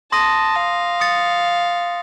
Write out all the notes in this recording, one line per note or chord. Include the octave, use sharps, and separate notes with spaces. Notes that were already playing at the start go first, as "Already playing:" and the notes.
A5 C6 D#6 A#6 D#7
F5
D#6 A6 C#7